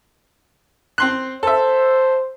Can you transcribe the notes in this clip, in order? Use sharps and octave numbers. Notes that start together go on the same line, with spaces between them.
C4 C6 F#6
A4 C5 E5